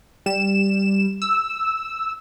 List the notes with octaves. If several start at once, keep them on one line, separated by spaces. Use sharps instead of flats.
G3 E7
E6